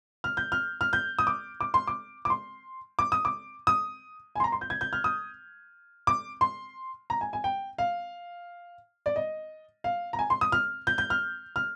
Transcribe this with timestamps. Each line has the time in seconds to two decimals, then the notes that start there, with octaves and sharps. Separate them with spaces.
0.24 F6
0.37 G6
0.52 F6
0.81 F6
0.93 G6
1.19 D#6
1.27 D6
1.61 D6
1.74 C6
1.87 D6
2.25 D6
2.30 C6
2.99 D6
3.12 D#6
3.25 D6
3.67 D#6
4.35 G#5
4.40 C6
4.44 A#5
4.52 C6
4.61 G6
4.70 G#6
4.81 G6
4.93 F6
5.04 D#6
6.07 D6
6.41 C6
7.10 A#5
7.21 G#5
7.33 G#5
7.44 G5
7.78 F5
9.06 D5
9.16 D#5
9.84 F5
10.13 A#5
10.19 G#5
10.30 C6
10.41 D#6
10.52 F6
10.87 G6
10.98 G6
11.10 F6
11.56 F6